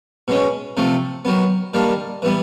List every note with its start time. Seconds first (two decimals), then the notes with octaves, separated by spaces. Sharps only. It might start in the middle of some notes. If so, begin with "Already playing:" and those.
0.28 B2 G#3 C#4
0.77 C3 F3 A3
1.25 D#3 F#3 B3
1.74 D#3 G3 A#3 D4
2.22 E3 G3 B3